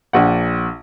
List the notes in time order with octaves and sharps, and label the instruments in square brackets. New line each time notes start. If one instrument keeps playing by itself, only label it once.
[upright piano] A#1 F#5